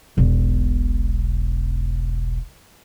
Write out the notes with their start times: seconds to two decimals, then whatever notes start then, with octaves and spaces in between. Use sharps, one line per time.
0.17 E1 B1